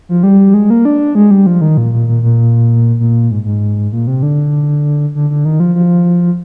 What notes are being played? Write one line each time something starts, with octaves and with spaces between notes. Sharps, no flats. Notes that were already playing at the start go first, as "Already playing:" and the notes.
F3
G3
G#3
A#3
D4
G#3
G3
F3
D#3
A#2
A#2
A#2
A#2
A#2
G#2
G#2
A#2
C3
D3
D3
D3
D#3
F3
F3